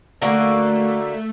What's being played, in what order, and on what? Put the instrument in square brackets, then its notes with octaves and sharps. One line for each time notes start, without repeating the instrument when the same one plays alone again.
[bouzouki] D3 A#3 F#4 [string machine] A3